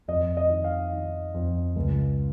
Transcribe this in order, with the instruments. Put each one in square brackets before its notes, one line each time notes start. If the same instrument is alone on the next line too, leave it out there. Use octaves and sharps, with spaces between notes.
[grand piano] F2 D#5
D#5
D#3
F5
D#3
F2
C#2